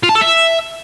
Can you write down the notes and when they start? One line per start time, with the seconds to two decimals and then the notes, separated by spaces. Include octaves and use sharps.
0.03 F4
0.09 A5
0.15 A4
0.21 E5